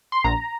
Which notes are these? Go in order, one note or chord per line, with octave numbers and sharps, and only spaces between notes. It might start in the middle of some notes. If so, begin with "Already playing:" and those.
C6
A#1 A#5